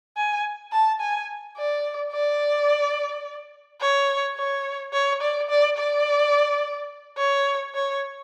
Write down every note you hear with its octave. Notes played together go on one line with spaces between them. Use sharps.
G#5
A5
G#5
D5
D5
C#5
C#5
C#5
D5
D5
D5
C#5
C#5